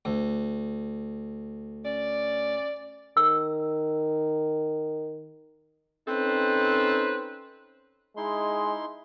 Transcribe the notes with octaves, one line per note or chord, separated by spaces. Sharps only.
D2
C#4 D5
D#3 E6
C4 C#4 D#4 A4 B4 C5
G#3 D#4 E4 C6